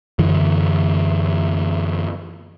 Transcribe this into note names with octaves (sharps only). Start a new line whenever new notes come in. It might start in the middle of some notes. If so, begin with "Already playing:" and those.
F#2 D3 E3